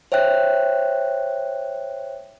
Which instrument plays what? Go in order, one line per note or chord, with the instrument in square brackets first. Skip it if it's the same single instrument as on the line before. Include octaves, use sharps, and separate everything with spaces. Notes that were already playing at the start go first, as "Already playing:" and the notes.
[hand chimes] C5 C#5 E5 G5 F#6